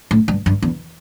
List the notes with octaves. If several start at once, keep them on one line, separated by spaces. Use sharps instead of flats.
A2
G2
G2
E2